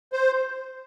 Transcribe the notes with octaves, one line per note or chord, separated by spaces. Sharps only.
C5